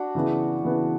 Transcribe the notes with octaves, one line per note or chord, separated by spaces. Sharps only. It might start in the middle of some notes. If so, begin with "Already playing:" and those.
Already playing: D4 F#4
C#3 E3 B3
C#3 E3 B3